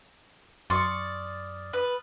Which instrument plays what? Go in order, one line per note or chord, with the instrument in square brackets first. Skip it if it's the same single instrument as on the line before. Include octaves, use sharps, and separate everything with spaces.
[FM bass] F#2 [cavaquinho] D5 C6 [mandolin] C#6 [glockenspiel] D#6 F6 A6
[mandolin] B4